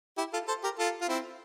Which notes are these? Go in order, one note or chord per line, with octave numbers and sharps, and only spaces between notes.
E4 G4
F4 A4
A4 C5
G4 A#4
F4 A4
F4
C4 E4